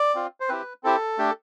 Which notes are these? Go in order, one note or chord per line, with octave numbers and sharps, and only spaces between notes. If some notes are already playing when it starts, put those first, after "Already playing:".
Already playing: D5
C4 F4
C5
C4 E4 G4 B4
C4 E4 G4 A4
A3 D4 G4